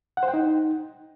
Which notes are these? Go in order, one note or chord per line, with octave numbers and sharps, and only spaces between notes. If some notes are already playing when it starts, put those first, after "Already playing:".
F#5
C5
G5
D#4